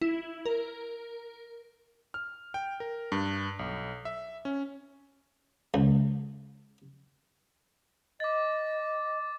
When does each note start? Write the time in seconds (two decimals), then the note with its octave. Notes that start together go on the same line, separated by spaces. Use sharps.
0.01 E4
0.46 A#4
2.14 F6
2.54 G5
2.80 A#4
3.12 G2
3.59 B1
4.05 E5
4.45 C#4
5.74 C#2
8.20 D#5 D6 A6